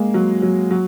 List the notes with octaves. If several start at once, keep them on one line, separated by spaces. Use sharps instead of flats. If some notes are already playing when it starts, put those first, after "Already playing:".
Already playing: G#3 A#3
F#3
F#3
F#3